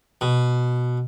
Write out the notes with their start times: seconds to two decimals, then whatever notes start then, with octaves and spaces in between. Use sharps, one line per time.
0.21 B2